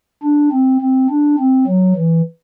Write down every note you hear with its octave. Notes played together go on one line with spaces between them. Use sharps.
D4
C4
C4
D4
C4
F#3
E3